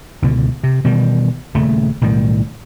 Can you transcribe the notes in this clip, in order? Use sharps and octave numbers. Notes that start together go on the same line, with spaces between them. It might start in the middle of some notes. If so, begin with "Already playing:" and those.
C#2 B2 D3
C3
B2 D#3 E3 G3
D#1 C#3 A3
B1 A2 D#3 G3